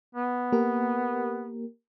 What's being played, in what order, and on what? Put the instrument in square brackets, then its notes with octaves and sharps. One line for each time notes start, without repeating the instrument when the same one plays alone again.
[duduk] B3
[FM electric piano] A#3 G4 A#4